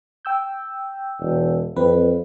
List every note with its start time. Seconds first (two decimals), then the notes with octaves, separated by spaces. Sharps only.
0.25 G5 E6 G6
1.20 E1
1.76 F2 C4 B4